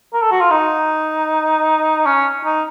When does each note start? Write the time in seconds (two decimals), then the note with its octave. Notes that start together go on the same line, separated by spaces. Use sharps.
0.13 A#4
0.22 A4
0.31 F#4
0.41 F4
0.51 D#4
2.06 C#4
2.44 D#4